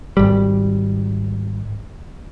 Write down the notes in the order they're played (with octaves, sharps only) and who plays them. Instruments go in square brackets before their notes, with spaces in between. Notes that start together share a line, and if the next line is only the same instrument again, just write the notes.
[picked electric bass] G#1 G3